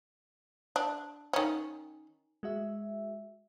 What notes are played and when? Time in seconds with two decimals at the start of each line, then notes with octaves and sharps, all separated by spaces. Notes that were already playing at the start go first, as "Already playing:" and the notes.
0.76 D4
1.33 D#3 C#4
2.43 G#3 F#4 E5